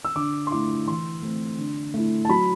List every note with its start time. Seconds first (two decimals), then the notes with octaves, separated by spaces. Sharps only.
0.05 E6
0.16 D3 D6
0.47 C6
0.51 A3 E4 D6
0.86 E3 C6
1.22 A3 C4
1.58 D3
1.94 A3 E4
2.25 A5
2.29 F#3 B5